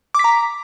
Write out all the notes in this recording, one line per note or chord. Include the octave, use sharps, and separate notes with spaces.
A#5 D6 B6